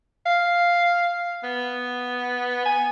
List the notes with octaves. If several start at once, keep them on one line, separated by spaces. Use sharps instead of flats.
F5
B3
G#5